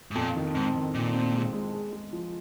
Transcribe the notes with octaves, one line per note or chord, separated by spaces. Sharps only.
G#2
F2 A#2
D#3
G#2 C4
D#3
A#2 D#3
C4
G#3
G#3
G#4
G#3
F3